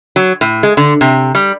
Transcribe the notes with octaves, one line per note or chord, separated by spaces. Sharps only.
F#3
A2
G#3
D3
C3
G3